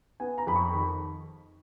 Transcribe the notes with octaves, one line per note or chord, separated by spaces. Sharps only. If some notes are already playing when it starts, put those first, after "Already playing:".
B3 G#5
A#5
F2 B5
C#6
D#3 B5